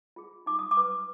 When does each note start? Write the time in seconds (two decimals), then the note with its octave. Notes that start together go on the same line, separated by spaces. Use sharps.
0.16 F4 G#4
0.46 D#4 D6
0.59 D#6
0.71 D6
0.77 B4